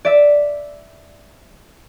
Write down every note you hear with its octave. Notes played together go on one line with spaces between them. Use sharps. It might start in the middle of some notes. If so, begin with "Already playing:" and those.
D5 E5 E6